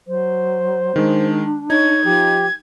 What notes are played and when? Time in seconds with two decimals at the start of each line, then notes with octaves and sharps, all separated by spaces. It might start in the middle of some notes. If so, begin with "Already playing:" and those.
0.07 F#3 C5
0.96 D#3 G#3 D4
1.70 D#4 C#5 G#6
2.04 F3 G4